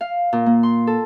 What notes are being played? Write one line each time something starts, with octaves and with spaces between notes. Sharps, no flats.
F5
A#2
A#3
C6
A4